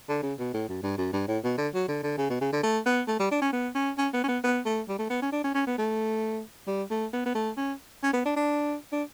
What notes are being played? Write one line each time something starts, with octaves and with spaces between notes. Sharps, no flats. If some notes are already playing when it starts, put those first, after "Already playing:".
D3
C#3
B2
A2
F#2
G2
F#2
G2
A2
B2
D3
F#3
D3
D3
C#3
B2
C#3
D3
A3
B3
A3
G3
D4
C#4
B3
C#4
C#4
B3
C#4
B3
B3
A3
G3
A3
B3
C#4
D4
C#4
C#4
B3
A3
G3
A3
B3
B3
A3
C#4
C#4
B3
D4
D4
D4